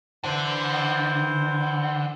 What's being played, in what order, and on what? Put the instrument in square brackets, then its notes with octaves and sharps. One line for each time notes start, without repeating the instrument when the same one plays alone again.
[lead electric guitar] D3 [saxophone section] E3 C5